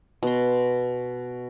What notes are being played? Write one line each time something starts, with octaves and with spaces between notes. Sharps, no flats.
B2 C6